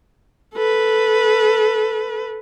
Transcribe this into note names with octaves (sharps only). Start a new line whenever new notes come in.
A4 B4